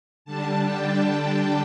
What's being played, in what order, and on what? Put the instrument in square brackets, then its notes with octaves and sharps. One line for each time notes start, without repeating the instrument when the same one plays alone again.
[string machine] D3 G3 D4 A5
G5
A5